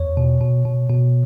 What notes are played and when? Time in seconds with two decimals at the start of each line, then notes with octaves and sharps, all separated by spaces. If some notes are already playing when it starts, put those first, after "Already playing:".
Already playing: E2 C#5
0.17 B2
0.41 B2
0.65 B2
0.89 B2